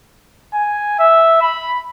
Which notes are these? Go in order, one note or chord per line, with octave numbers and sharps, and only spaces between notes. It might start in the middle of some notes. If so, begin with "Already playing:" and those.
G#5
E5
B5